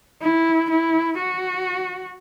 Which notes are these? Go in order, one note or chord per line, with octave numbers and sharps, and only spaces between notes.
E4
E4
F#4